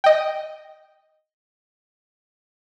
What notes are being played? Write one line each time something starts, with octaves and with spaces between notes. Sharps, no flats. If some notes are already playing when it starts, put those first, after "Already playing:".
D#5 G5